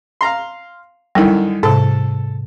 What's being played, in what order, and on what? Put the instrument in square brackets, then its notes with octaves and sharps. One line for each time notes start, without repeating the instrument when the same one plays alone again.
[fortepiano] F5 A#5 C6
[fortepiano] F#2 D3 D#3 [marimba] G3 E4
[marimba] G#2 C3 [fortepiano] A4